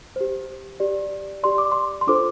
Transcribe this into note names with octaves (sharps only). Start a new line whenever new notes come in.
G4 C5
G4 D5
G4 D5 C6
D6
C6
C6
D4 F4 A4 C5 D6